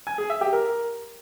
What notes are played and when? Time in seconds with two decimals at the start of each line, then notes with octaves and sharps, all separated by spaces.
0.07 G#5
0.18 G#4
0.30 E5
0.41 G4
0.53 A#4